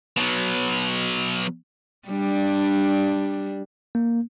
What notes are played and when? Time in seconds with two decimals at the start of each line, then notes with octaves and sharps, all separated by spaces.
0.17 B2 F#3
2.08 G3 D4
3.95 A#3